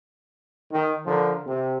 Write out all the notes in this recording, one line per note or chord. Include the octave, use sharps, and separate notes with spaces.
D#3
D3 F3 A#4
C3